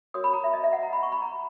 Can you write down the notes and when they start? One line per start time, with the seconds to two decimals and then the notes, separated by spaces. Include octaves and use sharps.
0.14 F#4 A#4 C#5 D#6
0.24 B5
0.33 A#5
0.44 E5
0.54 D#5
0.64 E5
0.73 F#5
0.83 A#5
0.93 B5
1.03 C#6
1.12 B5
1.22 A#5